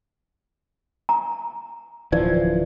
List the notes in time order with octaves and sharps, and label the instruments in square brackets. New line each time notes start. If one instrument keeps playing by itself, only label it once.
[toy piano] A#5
[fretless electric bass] D1 E3 F3 [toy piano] D5